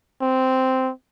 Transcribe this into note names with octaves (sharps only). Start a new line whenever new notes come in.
C4